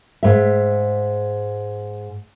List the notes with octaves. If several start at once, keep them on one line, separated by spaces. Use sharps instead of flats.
G#2 E5